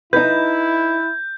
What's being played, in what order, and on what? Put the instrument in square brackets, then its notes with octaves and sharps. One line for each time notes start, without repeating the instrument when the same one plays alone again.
[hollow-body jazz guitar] D#4 B4 [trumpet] E4 [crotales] G6